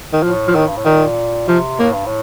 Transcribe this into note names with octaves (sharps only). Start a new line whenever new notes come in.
D#3
A2 F3
F3
D#3
G2
A2
A#2 D#3
C3 F3
A2 A#3
G2
A2